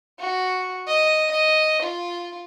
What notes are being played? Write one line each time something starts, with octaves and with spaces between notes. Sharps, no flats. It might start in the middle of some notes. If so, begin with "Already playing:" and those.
F#4
D#5
D#5
F4